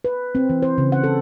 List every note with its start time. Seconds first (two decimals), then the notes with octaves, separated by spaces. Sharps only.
0.05 B4
0.35 C4
0.50 E3
0.62 C5
0.78 C#3
0.92 F#5
1.04 A4